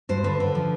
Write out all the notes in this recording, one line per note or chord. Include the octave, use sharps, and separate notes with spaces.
G2 C5
D3 B4
D3
F3